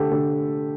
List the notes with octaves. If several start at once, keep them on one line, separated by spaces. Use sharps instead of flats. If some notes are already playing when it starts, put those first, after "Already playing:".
Already playing: D3 A3 G4 A4
D3 A4